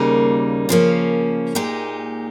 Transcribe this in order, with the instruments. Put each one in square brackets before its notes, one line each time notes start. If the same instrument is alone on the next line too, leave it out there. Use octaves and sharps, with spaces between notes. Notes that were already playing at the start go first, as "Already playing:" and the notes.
Already playing: [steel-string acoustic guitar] D#2 C#3 G3 A#3 D#4
C#3 F3 A#3 C#4
A#2 G#3 D#4 G4